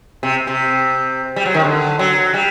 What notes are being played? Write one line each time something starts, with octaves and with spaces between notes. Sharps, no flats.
C3
C3
G3
F#3
D#3
D3
F#3
G3